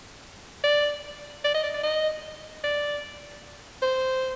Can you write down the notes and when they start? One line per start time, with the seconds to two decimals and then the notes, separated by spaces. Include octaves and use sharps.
0.64 D5
1.44 D5
1.55 D#5
1.64 D5
1.74 D5
1.84 D#5
2.64 D5
3.82 C5